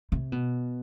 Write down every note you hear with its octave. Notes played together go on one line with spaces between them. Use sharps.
C3
B2